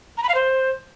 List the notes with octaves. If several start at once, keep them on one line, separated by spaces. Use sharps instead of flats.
A#5
B5
F5
C5